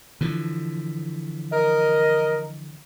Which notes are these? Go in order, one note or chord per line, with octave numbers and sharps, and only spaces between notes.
D3 E3 F3
A#4 D#5